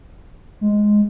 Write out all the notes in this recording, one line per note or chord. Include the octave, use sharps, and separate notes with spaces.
G#3